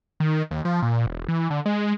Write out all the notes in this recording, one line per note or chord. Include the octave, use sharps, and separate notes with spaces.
D#3
D#2
F3
A#2
E1
E3
D3
G#3